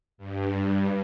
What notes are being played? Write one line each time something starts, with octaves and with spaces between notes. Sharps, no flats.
G2